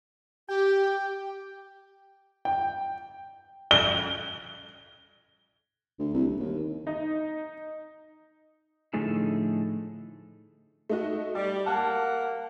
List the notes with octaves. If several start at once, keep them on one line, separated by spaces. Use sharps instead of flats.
G4 G5
G5
G7
D2
C2
D#1
D#2
D#4
A2 D3 F3 A3 D#4 G#4
A3 D#4 F#4
G3 D5
A#3 F#5 A5